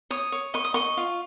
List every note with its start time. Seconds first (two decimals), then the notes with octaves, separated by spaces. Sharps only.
0.11 C#5 D#6
0.32 C#5
0.54 D#5 C#6
0.65 D#6
0.74 D#5 C#6
0.97 F4